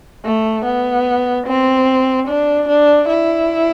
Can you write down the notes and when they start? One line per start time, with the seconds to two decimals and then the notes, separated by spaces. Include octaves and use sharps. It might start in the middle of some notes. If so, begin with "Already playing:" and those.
0.25 A3
0.65 B3
1.46 C4
2.28 D4
2.68 D4
3.08 E4